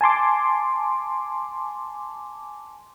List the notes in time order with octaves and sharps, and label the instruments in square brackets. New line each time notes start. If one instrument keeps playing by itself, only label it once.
[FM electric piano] G#5 A5 C6 D6